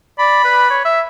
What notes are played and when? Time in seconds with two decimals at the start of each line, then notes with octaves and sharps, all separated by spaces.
0.19 D5 B5
0.44 B4
0.70 C#5
0.85 E5